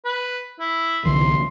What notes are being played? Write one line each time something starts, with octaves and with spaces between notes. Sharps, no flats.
B4
E4
C2 D3 E3 C6